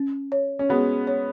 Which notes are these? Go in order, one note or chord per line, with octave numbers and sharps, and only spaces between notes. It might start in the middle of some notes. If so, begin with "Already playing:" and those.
Already playing: C#4
C#5
C#4
G#3 B3 F#4
C#5